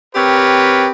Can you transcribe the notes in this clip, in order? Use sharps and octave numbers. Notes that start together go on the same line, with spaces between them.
C4 G4 A#4 B4 C#5